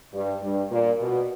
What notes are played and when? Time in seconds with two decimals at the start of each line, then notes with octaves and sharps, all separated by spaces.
0.13 G2
0.42 G2
0.71 A#2
1.00 B2